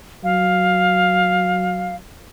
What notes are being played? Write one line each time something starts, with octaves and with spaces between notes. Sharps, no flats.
F#3 F5